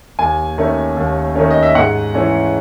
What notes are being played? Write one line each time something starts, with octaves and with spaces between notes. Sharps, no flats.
D#2 G#5
D#3 A3 C#4
D#2
D#3 A3 C#4
D#5
E5
G#2 F#5
E3 A3 C#4